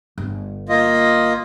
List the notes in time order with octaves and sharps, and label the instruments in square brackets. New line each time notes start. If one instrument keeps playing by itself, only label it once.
[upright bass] G1
[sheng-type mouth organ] A#3 F4 D#5